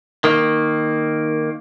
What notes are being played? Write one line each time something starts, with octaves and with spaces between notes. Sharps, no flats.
D#3 A#3